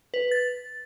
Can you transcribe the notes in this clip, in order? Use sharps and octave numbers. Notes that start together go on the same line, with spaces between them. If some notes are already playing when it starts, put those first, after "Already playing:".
B4
A6